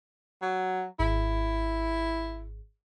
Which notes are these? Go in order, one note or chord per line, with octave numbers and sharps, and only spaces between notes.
F#3
G#1 E4